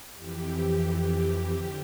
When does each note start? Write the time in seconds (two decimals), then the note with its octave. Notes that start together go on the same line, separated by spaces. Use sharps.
0.14 F2 E3 G4
0.83 G4
1.51 D3 F3 G4